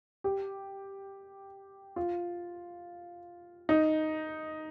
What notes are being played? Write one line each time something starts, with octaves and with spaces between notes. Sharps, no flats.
G4
F4
D#4